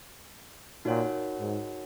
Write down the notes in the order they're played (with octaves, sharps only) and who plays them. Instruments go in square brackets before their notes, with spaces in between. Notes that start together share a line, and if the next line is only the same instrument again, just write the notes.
[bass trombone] A#2 [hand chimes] D#4 F#4 A#4 C#5 F#5
[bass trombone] G#2